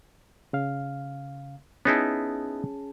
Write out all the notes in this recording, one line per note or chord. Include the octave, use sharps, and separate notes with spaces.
C#3 F5
B3 C#4 D#4 E4 G#4 A5